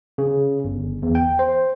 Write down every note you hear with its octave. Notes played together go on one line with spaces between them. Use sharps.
C#3
G1
E2
G5
C5